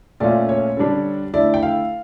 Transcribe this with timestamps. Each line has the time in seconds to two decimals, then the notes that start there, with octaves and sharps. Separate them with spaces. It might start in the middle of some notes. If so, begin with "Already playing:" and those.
0.20 A#2 A3 C#4 F4 D5
0.49 C#5
0.77 D3 G3 D4
1.34 D3 A3 E4 D5
1.54 G5
1.63 F5